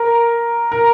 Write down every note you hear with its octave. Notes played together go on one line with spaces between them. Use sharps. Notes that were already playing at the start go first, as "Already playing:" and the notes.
Already playing: A#4
A#4